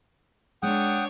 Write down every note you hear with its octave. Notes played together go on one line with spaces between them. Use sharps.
G#3 D4 C#5 F#5 G5 D#6